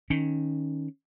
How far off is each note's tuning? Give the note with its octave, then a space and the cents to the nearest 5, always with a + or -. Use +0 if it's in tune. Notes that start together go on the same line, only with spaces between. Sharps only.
D#3 +0 C#4 +0